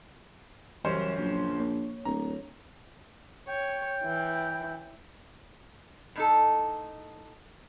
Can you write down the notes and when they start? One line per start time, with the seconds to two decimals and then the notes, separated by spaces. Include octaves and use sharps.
0.85 F#1 F#2 E3 G3 C#4 C5
1.19 A#1 F#3
1.60 A#3 C#5
2.05 D1 A#5
3.48 C#5 G5
4.04 E3
6.16 A2 D#4 A4